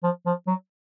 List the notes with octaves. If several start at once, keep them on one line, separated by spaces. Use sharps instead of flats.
F3
F3
F#3